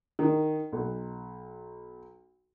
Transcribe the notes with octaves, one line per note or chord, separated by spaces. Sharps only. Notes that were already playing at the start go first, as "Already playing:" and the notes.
D#3
B1